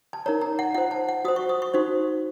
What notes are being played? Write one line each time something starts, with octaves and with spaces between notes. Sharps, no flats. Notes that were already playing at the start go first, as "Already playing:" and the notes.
A5
D#4 A#4 C#5 A#5
A#5
F#5
F4 C5 F#5
A5
F#5
F#4 C5 D#6
C#6
D#6
C#6
D#4 F#4 C5